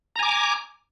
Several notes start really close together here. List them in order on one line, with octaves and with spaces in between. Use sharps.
A#5 G#5 D6